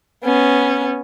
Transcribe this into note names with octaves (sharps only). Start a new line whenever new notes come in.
B3 C#4